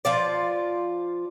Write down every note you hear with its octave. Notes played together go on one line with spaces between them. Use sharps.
F3 F4 D5